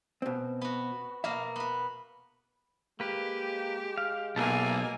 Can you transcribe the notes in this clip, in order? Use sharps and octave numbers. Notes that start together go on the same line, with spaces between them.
B2 C4
B3 F#4
B2 A#3 E5 F5
B3 B4
G#3 A#3 G4 B4
F5
B1 A#3 E4 G#4 G#5 A5